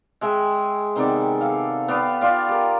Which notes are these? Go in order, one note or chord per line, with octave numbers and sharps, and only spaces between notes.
G#3 G#4 E5 G5
C3 D#3 B3 D5
A4 F5
B3 D5 F5 G5
F4 D5 F5
G4 A#4